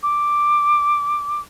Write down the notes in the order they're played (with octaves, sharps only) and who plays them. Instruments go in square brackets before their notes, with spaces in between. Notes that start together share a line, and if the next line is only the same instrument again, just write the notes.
[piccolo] D6